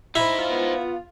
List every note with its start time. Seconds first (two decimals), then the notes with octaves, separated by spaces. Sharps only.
0.15 D#4 E4 C5 B5
0.39 F4
0.50 B3